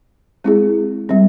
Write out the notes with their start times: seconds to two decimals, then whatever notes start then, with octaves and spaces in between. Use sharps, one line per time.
0.44 G#3 C4 E4 G#4
1.09 G3 C4